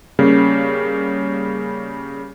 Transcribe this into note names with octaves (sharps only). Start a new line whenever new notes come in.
C#3 G3 A#3 C#4